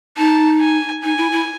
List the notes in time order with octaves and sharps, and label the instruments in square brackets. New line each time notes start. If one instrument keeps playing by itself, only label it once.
[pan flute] D#4 [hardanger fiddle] A5
[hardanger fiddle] G#5
[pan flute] D#4 [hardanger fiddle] G#5
[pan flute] E4
E4